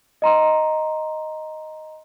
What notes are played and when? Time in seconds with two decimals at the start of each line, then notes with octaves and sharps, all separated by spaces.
0.22 D#5 A#5 C6